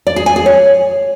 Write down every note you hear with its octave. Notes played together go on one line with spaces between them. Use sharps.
D5
G#4
G#5
G#4
C#5